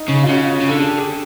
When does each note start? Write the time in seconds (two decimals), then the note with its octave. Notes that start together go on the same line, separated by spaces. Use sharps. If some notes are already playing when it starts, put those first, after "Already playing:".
Already playing: D#4
0.09 C#3
0.24 F4
0.29 C#3 F#4
0.61 C#3
0.69 D3 A4
0.79 G#4
0.88 G4
0.98 G#4